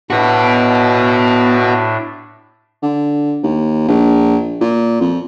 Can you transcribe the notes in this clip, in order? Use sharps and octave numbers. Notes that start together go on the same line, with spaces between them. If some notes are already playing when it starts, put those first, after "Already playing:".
A2 D4 F#4 B4
D3
D#2
A#1
A#2
F2